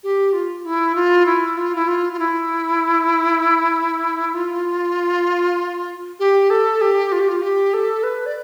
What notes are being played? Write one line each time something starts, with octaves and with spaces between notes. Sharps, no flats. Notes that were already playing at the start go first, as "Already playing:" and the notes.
G4
F4
E4
F4
E4
F4
E4
F4
F4
E4
F4
G4
A4
G4
F4
G4
F4
G4
A4
B4
D5